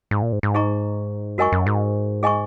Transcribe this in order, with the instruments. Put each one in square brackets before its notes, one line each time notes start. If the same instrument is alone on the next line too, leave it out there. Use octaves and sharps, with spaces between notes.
[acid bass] G#2
A#2
G#2
G#2
[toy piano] D#4 G#4 D#5 A#5 C#6
[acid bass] F#2 [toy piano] F#4 A#4 D#5 G#5 C#6
[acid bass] F#2
G#2
[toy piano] G#4 D#5 G#5 C#6